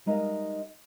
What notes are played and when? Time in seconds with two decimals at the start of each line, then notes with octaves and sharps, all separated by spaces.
0.06 G3 G#3 D#4 A#4 E5 F5